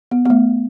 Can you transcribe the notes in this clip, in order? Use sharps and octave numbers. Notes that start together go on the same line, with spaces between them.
B3
B3
A3